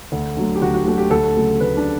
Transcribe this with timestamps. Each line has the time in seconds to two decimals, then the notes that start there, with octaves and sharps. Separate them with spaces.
0.12 D2
0.37 D3 F#3 A3
0.56 G4
0.61 D2 F#4
0.74 F#4
0.86 D3 F#3 A3 F#4
0.98 G4
1.10 D2 A4
1.36 C#3 F#3 A3
1.60 D2 B4
1.77 D4